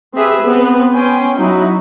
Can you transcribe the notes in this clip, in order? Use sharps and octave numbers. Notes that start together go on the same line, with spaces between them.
C4 G4 G#4 B4 E5
B3 C4
B3 C#4 G5 G#5 C6
F#3 D#4 E4 F#4